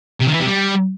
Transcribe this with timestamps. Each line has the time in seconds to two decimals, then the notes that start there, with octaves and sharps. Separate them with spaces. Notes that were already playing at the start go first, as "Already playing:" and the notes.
0.21 C3
0.27 D#3
0.34 E3
0.40 C3
0.46 G3